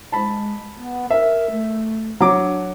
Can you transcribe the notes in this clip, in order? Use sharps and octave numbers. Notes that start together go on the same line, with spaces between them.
G#3 A5 B5
B3
A#4 E5
A3
F#3 D4 D6